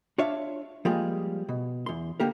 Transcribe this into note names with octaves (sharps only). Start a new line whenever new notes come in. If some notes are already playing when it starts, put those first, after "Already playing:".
D4 F4 C#5 E5 F5
F3 G3 G#3 A#3 G#4
B2
E2 C6
D3 A#3 G4 A#4